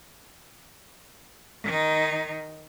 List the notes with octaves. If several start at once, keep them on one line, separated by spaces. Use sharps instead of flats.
D#3 D#4